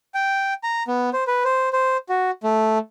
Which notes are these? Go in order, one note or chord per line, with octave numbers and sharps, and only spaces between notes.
G5
A#5
B3
C5
B4
C5
C5
F#4
A3